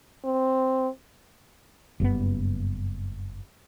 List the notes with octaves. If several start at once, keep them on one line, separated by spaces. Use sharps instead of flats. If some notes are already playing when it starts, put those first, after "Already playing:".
C4
F#1 G2 C#3 B3